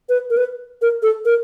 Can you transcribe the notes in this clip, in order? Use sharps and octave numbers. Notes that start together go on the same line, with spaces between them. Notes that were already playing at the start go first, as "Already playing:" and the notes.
B4
A#4
B4
A#4
A4
A#4